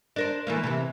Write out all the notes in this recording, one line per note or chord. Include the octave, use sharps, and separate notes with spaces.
D4 A#4 C5
E3 A3 A#3
C3 E3